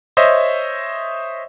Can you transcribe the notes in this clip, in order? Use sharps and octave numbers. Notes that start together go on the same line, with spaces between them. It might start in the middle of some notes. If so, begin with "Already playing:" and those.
C5 C#5 D#5 E5